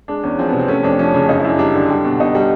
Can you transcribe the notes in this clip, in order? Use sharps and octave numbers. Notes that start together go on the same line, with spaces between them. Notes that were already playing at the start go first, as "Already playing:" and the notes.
G#3 D4
E2 C#4
F3 C4
B3
C3
C4
A3 C#4
F2 D4
F3 C#4
C#3 D4
F#2 D#4
E4
F#2 D4
G3 D4
D3
G3
B2
B2 D#4
G3